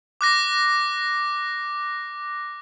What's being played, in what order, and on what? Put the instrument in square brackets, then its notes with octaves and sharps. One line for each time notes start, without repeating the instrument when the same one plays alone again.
[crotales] D6 F#6 A#6